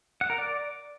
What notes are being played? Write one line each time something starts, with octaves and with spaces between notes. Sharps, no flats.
F#5
A#4
D5